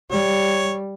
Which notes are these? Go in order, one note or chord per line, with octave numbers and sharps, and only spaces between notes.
G3 C#5